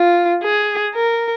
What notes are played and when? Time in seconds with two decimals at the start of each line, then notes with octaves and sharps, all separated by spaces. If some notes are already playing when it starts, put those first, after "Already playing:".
Already playing: F4
0.43 G#4
0.95 A#4